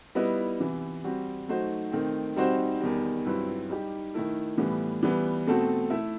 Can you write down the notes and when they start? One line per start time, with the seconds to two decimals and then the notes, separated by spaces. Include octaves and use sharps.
0.15 G3 B3 E4 B4 D#5
0.59 C3 E3 B3
1.04 G3 C4 F#4
1.48 F#3 A3 D#4 F#4 C5
1.92 D#3 A3 C4
2.36 G3 C4 D#4 F#4 C5
2.81 E2 D#3 G3
3.26 G2 F#3 C4 E4 B4
3.70 G3 D#4 G4
4.14 D#3 A3 E4 A4
4.58 A2 E3 G3 B3
5.03 E3 G3 B3
5.47 B2 A3 C4 F#4 A4
5.90 A3 E4 A4 E5